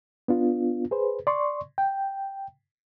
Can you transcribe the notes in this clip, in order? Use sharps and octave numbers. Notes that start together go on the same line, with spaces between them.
B3 D4 F4
G#4 B4 C5
D5 C6 C#6
G5